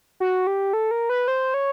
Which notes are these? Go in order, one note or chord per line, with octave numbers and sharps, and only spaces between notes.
F#4
G4
A4
A#4
B4
C5
C#5